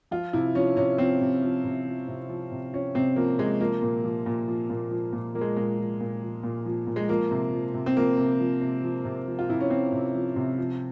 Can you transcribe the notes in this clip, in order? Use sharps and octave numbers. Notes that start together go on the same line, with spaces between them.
F3 F4
C3 E4
F3 C#4
C3 C#4
F3 C4
C3
F3
C3
F3
C3
F3
C3
F3 C#4
C3 C4
F3 A#3
C3 G#3
F3 A#3
A#2
F3
A#2
F3
A#2
F3
A#2
F3 A#3
G#3
A#2 G#3
F3
A#2
F3
A#2
F3
A#2
G#3
F3 A#3
C3
F3
C3
C4
F3 A#3
C3
F3
C3
F3
C3
F3
F4
C3 E4
C#4
F3 C4
C3
F3
C3
F3